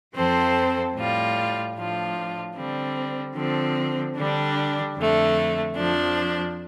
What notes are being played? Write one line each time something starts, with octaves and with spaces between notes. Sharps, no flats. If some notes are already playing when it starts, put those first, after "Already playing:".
F2 F3 C4 A4 C5
A2 G3 F4
A2 F3 D4 F4
D3 G3 C4
D3 F3 C4
D3 G3 D4
F2 D3 A3
F2 F3 D4